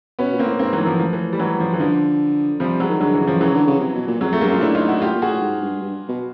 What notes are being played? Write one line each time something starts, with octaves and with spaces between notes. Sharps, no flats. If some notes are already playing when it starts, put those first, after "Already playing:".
B2 B3 C#4
A#2
A#3 C4
A2
G#2 A#3 C4
E3 F#3
G#2
F3
A2 F3
E3
G3
E3 F#3
F3
E3
D3 F3
C3 F3 G3
F#3 G#3
D#3
D3 F#3 G#3
E3
C#3
F3
C#3 E3 F#3
D3
C#3
C3
B2
A#2
F2 F#3 G#3
F2 A3
G2 G#3 A#3
F#2 F4
A2 D4 E4
D#4 F4
E4 F#4
A2 F4 G4
A#2
F#4 G#4
A2
G#2
G2
G2
B2